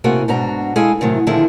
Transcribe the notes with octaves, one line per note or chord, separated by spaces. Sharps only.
A2 C3 A#3 F#4 G#4 G#5
G#2 B2 D4 F#4 A#5
G#3 E4 G#4 A4 F5 G#5
A2 C3 D#3 F#3
A#2 D3 D#3 F3 E4 G#4